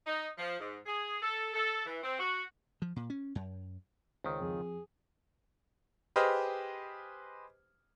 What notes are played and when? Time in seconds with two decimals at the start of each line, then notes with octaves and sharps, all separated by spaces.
0.06 D#4
0.38 F3
0.60 G#2
0.86 G#4
1.22 A4
1.53 A4
1.86 E3
2.03 C4
2.19 F#4
2.82 F3
2.96 A#2
3.10 C#4
3.35 F#2
4.24 C#2 D#3 C4
4.41 F2 G#4
6.16 G4 G#4 B4 C5 D#5 F6